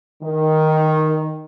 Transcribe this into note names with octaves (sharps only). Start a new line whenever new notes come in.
D#3